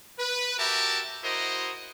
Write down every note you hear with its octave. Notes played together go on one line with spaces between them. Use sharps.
B4
F#4 G4 A#4 E5 A5
E4 F#4 A#4 C5 D#5